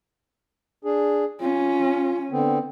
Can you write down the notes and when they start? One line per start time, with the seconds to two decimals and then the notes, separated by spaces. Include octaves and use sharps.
0.85 D4 G#4
1.41 C#4 F4
2.32 D3 B3 C4